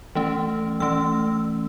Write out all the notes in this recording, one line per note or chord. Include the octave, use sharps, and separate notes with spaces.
E3 A3 C#4
E3 A3 C#4 E6